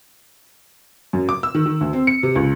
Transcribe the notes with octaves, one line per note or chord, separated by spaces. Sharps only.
F#2
D6
E6
D#3
D#3
D2
C4
C#7
C3
C#2